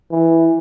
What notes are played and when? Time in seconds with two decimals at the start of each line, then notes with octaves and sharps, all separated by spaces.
0.11 E3